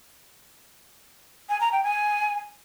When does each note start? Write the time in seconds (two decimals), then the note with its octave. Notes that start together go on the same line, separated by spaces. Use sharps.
1.49 G#5
1.61 A#5
1.72 G5
1.84 G#5